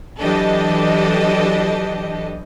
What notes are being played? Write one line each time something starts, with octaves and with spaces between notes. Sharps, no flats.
E3 F#3 D4 G4 A4 D#5